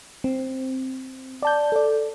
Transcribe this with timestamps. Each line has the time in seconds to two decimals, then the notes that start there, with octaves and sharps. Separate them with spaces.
0.24 C4
1.42 D5 A5 G6
1.72 A4 D5